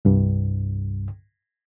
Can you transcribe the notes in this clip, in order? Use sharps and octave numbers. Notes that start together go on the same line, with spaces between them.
C2 G2